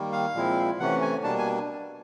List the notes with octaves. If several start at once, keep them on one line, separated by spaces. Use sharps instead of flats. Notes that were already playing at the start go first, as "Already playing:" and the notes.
Already playing: D#3 G3 A#3
F5
A#2 F3 G#3 C4 E4
C3 E3 A3 C#4 F#5
G#5
B2 G3 A#3 D4 A5
G#5